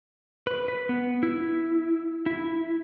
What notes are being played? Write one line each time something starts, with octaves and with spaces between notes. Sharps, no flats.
B4
B4
B3
E4
E4